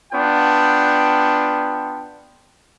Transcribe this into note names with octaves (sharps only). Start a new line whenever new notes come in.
B3 D4 F4 G5